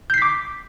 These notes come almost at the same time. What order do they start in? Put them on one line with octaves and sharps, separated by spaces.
G6 C7 B6 D6